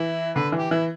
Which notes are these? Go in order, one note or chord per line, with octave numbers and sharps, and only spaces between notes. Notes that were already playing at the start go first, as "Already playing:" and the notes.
Already playing: E3 E4
D3 B4
E3
G4
E3 E4